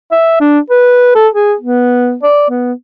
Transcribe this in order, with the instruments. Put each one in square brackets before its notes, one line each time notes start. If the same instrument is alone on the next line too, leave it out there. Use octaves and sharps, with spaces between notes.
[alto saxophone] E5
D4
B4
A4
G#4
B3
D5
B3